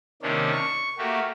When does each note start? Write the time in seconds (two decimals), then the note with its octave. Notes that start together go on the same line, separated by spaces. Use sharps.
0.22 C3 D#3 A#3 C#4 D4
0.52 C#6
0.98 A3 A#3 F#4 G4